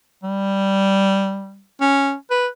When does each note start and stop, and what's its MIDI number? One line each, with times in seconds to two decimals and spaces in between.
0.23 1.64 55
1.81 2.14 61
2.31 2.47 71